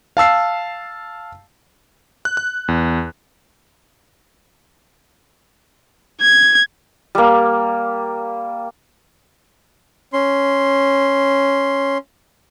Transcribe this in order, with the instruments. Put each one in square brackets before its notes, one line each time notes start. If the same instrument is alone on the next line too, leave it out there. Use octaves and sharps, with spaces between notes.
[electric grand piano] F5 A5 E6 C7
F#6
F#6
E2
[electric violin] G#6
[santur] G3 A#3
[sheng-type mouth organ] C#4 C6